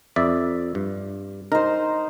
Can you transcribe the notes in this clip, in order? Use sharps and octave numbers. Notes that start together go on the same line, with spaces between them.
F2 D5 E5
G2
D#4 A#4 C5